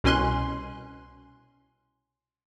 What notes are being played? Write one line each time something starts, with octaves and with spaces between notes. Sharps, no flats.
C2 B2 C#4 G#5 C6 F#6